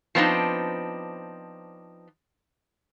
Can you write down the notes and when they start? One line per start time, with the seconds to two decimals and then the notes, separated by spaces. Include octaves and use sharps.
0.15 F3 B3 C4 D4 D#4